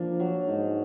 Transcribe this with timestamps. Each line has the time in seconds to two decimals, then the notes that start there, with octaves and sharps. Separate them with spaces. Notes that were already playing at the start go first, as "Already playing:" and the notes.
Already playing: F3 A#3 D4
0.20 F#3
0.47 G#2 D#4